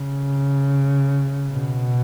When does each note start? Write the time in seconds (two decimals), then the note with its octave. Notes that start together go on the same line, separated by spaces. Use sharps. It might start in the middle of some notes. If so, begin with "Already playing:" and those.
Already playing: C#3
1.52 B2